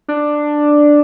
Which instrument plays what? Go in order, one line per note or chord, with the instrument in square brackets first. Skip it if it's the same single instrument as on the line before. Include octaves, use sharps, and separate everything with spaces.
[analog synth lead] D4